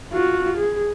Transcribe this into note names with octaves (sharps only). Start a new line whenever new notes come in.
F4 F#4
G#4